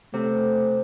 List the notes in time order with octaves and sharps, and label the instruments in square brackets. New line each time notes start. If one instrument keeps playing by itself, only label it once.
[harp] C3 [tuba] A3